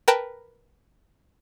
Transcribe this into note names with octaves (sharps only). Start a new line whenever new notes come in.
A#4 B4 G5 A5